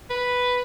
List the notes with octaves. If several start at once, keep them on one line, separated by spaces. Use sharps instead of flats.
B4